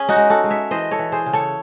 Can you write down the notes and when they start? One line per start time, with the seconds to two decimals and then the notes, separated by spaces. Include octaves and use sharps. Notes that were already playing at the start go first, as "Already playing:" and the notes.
Already playing: C#4 G#4
0.09 D#4 F#4
0.16 G#3
0.30 F#4 A4
0.44 G#3
0.50 C#5 E5
0.71 E3 C5 D#5
0.91 A4 C#5
0.99 E3
1.12 G#4 C5
1.26 C#3
1.33 A4 C#5